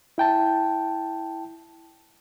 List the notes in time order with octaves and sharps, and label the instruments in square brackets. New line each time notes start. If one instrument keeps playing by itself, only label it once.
[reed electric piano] E4 G5 A5